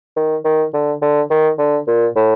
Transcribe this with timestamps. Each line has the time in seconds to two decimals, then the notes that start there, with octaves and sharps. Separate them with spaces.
0.17 D#3
0.45 D#3
0.74 D3
1.02 D3
1.30 D#3
1.58 D3
1.87 A#2
2.16 A2